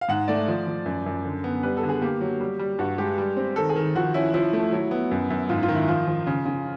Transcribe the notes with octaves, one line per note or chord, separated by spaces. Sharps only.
F5
G#2 F#5
A3 D5
F3
F3
F#2
F#2
D3
B3
G3 B4
A4
D3
G#4
A#3 G4
F#3
G3
G3
G2 F#4
G#3 G4
G3
C4
D#3 A4
G#4
D#3
F3 F#4
C#4 E4
F3 E4
A3
F#3 E4
B3
F#2
F#2
G#2 F4
F4
D#3
E4
F3 F4
F3
C#3
C#3